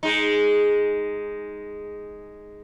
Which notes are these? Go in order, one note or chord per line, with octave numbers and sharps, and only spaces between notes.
G#3 D#4